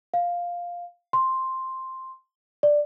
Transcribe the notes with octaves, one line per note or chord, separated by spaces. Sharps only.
F5
C6
D5